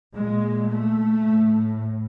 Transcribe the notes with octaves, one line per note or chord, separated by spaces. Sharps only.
A#2 G#3
A3
A2